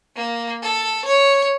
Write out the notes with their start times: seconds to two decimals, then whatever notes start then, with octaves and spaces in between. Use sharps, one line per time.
0.16 A#3
0.62 A4
1.05 C#5